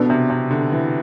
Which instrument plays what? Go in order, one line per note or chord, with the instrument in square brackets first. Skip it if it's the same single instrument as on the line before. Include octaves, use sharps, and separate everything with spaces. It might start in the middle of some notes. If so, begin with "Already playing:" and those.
Already playing: [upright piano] B2 [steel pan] B3 D4 A4
[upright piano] C3
C3
D3
E3